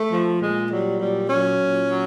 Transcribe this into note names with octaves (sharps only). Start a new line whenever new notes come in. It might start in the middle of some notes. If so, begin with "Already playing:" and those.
Already playing: A3
F3
A#2 G#3
F#3 G3
A#2 G3
F#3 C#4
A#2
F#3